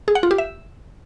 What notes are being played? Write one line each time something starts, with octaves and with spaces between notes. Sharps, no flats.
G#4
F#5
F4
G4
E5